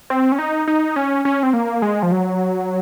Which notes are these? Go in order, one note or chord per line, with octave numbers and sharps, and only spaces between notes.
C4
C#4
D#4
D#4
C#4
C#4
C4
A#3
G#3
F3
F#3